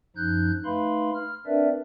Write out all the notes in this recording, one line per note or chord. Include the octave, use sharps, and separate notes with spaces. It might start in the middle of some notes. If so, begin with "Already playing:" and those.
F#2 F3 D#4 F#6 G6
A3 D#4 B4 F5 B5 C6
F6
C4 D4 A#4 B4 D5 E5